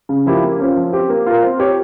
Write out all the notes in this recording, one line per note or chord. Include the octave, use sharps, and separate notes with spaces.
C#3
F3 A#3 E4 G4
A#3
C#4 F4 C5
F3
C4 G4
A#3
F4 A#4
C4
G4 C#5